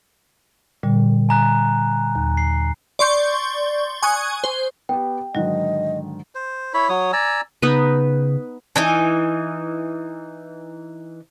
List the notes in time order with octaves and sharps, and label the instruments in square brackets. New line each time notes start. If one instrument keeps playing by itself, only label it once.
[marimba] A#2 D3 G3
[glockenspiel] G#5 A#5 F#6
[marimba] D#2
[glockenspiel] C7
[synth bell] D5 C6 C#6 G6
G#5 C#6 D#6 F#6 G#6
C5
[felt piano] B3 G4 [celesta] G5
[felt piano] G#2 D3 D#3 [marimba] F#3 F#4 [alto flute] D#5
[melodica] C5
E4 C#5 B5
F#3 C#5 D#6
D5 G#5 A#5 E6
[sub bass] C#3 [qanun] B3 D#4 B4
[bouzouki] E3 D#4 G#5